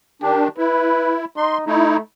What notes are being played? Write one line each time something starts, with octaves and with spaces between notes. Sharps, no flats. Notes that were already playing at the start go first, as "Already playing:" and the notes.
D#3 D4 G4
E4 B4
D#4 C6
A3 D#4 E4